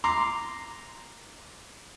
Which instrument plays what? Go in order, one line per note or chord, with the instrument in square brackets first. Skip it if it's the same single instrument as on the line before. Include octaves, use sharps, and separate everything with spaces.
[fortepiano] A#5 C6 D6